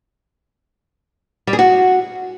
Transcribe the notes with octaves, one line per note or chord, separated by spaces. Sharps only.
G3
G#4
F#4